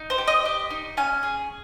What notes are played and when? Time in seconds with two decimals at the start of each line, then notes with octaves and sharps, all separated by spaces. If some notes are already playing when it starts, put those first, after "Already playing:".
Already playing: D#4
0.10 C5
0.18 G4
0.28 D#5
0.45 G4
0.71 D#4
0.97 C#4 G#5
1.23 G#4